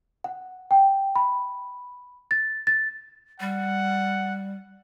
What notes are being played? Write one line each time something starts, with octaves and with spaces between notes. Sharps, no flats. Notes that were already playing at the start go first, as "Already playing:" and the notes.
F#5
G5
B5
A6
A6
G3 F#5